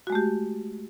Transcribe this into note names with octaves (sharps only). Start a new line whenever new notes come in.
G#3 A3 F#4 G4